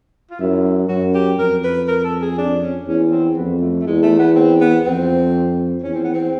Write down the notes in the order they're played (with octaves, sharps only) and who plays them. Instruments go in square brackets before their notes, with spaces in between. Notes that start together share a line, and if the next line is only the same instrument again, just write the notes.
[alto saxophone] F4
[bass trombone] F#2 [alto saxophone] E4
[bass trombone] F#2 [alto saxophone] F#4
[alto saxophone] G4
[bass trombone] F2 [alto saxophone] A#4
[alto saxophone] B4
A#4
A4
G#4
D4
C#4
[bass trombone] E2 [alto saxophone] C#4
[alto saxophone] C4
[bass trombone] F2 [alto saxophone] B3
[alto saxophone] A3
A3
[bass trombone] E2 [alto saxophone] G#3
[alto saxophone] A3
B3
C4
B3
[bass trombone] F2 [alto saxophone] C4
[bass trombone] E2 [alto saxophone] C#4
[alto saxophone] C4
B3
C4